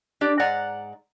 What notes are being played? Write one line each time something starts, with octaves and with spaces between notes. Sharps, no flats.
D4 G4 D5
G#2 D5 F#5 A#5